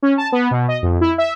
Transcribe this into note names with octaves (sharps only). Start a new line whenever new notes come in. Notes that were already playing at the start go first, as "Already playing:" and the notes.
C#4
A5
B3
B2
D#5
F2
E4
E5